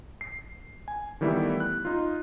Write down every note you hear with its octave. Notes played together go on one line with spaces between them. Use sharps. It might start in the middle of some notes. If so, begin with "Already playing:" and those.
C7
G#5
D#3 E3 G3 A3 B3 E4
F#6
D#4 F4